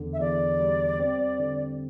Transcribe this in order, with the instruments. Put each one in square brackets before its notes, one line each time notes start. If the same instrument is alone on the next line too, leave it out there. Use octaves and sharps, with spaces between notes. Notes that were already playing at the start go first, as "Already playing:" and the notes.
Already playing: [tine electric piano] E2 D3
[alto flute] E5
[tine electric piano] E2 [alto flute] D5
[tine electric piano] G3
C4
D3